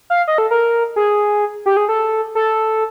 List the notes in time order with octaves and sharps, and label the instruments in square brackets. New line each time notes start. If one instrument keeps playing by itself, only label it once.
[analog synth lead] F5
D#5
A4
A#4
G#4
G4
G#4
A4
A4